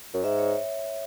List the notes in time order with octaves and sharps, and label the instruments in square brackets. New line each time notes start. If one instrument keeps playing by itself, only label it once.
[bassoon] F#2
[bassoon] G#2 [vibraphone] E5
[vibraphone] C#5